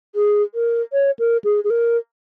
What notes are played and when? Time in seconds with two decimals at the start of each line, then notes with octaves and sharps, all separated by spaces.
0.15 G#4
0.55 A#4
0.93 C#5
1.19 A#4
1.44 G#4
1.64 G#4
1.70 A#4